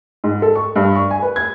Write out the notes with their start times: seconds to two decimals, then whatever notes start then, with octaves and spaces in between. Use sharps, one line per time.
0.24 G#2
0.42 A4
0.55 C#6
0.76 G2
0.95 C#6
1.11 G#5
1.22 B4
1.36 G#6